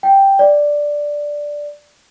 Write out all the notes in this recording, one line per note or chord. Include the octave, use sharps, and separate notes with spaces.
G5
D5